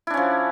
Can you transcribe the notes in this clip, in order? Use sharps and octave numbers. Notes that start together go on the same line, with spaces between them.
F3 C#4 D4 E4